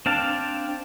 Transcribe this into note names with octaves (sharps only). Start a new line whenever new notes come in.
C4 D4 F5 A5